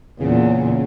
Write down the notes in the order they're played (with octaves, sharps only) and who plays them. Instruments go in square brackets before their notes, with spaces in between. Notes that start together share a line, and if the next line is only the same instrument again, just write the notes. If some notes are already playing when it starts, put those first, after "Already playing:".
[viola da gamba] E2 A#2 [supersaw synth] C#3